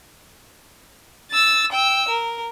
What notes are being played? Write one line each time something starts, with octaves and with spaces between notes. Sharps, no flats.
E6 A6
G5 E6
A#4